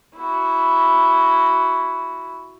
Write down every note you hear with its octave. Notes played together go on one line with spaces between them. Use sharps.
E4 F#4